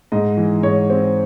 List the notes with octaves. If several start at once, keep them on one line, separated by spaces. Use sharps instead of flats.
G#2 D#5
E3
G#2 C#5
C4